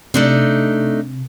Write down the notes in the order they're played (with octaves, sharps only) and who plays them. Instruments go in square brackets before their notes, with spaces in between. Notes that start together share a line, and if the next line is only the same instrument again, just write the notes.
[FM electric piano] C3 [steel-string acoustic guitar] A3 D4 D#4